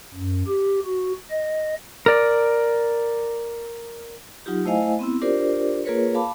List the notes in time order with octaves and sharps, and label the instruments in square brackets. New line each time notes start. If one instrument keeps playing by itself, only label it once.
[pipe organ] F#2
G4
F#4
D#5
[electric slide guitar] A#4 D5
[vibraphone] F#3 D#4 F4 G4
A3 E4 C5 D#5 F5 G#5
B3 C4 E4
D4 F4 G4 A#4 C5 D5
A#3 F4 G#4 A#4 B4 C#5
F5 A5 B5 D6